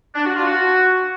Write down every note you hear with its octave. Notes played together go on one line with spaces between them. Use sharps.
D4
F#4
F4
F#4